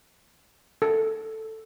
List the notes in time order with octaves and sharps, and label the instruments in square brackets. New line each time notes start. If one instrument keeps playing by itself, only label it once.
[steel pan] A4